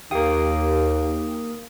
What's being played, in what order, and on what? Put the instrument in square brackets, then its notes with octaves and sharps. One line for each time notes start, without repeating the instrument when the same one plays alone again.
[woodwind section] D#2 [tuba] D#3 [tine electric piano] A#3 D#6 [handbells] G4 F5 G5